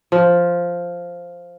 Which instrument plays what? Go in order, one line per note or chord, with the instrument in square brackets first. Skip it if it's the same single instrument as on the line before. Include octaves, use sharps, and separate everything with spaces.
[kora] F3